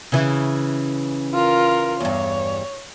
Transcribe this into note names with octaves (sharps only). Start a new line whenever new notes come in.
C#3 E3
F4 A#4
E2 G2 C#5